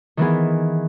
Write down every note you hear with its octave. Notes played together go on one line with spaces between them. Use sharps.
D#3 E3 B3 G#4